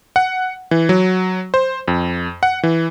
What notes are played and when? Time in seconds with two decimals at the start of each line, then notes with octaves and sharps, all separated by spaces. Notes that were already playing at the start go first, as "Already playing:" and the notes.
0.16 F#5
0.71 E3
0.89 F#3
1.54 C5
1.88 F2
2.43 F#5
2.63 E3